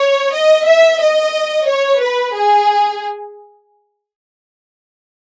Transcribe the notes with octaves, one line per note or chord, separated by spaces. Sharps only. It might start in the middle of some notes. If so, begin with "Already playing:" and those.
Already playing: C#5
D#5
E5
D#5
C#5
B4
G#4